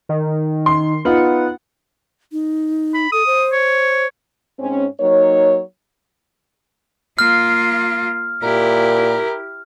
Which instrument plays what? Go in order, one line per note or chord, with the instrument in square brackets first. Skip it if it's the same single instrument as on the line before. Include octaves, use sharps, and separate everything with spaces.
[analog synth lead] D#3
[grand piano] C6
[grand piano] B3 D#4 F4 [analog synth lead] F#5
[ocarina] D#4
[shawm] B5
[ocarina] A4 [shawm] D#6
[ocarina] C5
[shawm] C#5
[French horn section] G#2 C4 C#4
F#3 A#3 D#4 C#5
[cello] A#3 F4 [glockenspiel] F6
[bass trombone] A#2 [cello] E4 G4 [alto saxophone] A#4